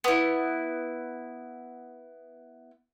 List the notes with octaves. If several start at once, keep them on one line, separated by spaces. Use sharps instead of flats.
B3 E4